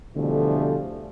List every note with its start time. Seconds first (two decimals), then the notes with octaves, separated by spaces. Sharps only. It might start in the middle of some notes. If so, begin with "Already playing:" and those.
0.15 B2 D3 E3 F3 G3 A3